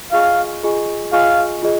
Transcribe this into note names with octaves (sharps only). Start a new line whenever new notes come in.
F4 G#4 D#5 F5 G#5 C#6
F4 G#4 D#5 G#5 C#6
F4 G#4 D#5 F5 G#5 C#6
F4 G#4 D#5